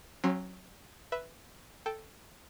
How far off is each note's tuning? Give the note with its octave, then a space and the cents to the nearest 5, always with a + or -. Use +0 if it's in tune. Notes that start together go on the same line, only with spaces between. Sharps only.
F#3 +0 C#4 -40 C6 +0
B4 +0 E5 +0
A4 +0 G5 +0